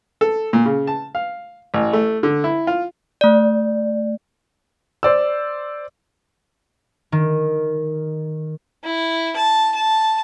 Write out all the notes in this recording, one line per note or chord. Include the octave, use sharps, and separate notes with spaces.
A4
A#2
C#3
A5
F5
A1
A3
D3
E4
F4
A3 D5
C5 D5 E6
D#3
E4
A5
A5